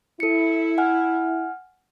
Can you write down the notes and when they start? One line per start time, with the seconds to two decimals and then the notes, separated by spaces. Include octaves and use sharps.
0.20 E4 A4 C#7
0.78 F#5 G#5 F6